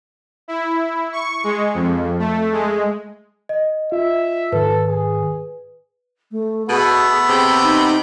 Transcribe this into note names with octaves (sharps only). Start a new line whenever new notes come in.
E4
C#6
G#3
F2
A3
G#3
D#5
F4 E5
G#2 D#3 A4 B4
G#4
A3
B2 A3 B3 G#4
C3 G5 B5
D#4